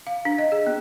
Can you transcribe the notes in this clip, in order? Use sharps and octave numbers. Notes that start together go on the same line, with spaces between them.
F5
D4
D#5
G#4
B3